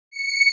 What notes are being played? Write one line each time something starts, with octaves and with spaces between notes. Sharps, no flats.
C#7